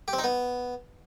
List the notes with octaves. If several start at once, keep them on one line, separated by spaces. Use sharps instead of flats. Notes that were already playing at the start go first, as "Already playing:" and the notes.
G4
C4
D#4
B3